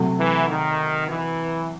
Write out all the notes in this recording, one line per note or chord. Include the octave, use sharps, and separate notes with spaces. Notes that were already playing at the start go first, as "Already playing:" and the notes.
Already playing: C3 F#3 A3
E3
D#3
E3